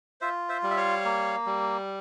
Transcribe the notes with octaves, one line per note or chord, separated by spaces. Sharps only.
F4 C5 E5
C5 E5
G3
E5
C#5 F5
A#3
G3